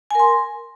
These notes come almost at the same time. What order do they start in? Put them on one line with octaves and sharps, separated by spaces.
G#5 A#4 C6